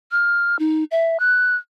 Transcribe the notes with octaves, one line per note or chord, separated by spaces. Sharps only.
F6
D#4
E5
F#6